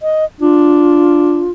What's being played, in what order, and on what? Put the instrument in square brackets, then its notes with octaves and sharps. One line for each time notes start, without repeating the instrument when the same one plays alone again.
[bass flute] D#5
[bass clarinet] D4 [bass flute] F4